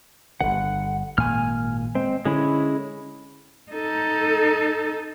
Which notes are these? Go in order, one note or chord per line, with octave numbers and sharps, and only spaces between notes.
G1 G2 D3 F#5
G#1 A#2 A#3 G#5 F6
G#3 C4
D3 G#3 C#4 E4
D#4 A4